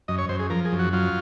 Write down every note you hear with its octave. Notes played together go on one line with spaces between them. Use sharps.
F#2 D#5
C#5
F#2 C5
G#4
F3 A#4
G#4
F#2
F#4
F#3 F4